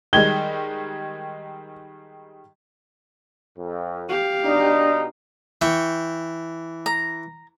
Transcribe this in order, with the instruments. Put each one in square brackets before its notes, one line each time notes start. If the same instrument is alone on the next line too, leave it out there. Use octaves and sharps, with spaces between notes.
[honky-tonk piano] D#3 G3 G#3 [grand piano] G#6 G7
[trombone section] F2
[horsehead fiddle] G4 F5
[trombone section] B2 D#4 [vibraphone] D4 D5
[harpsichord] E3 [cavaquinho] G5 C#6
[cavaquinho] A#5